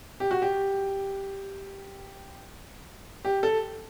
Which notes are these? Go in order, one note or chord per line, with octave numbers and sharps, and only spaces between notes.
G4
F#4
G4
G4
A4